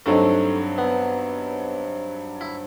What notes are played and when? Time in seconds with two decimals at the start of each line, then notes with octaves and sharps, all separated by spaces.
0.06 G2 F#3 A3 C4 D#4
0.78 B3
2.41 E4